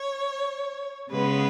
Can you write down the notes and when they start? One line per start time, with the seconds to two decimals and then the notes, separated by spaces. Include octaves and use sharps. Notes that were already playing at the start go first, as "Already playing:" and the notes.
Already playing: C#5
1.10 C#3 G#3 B3 B4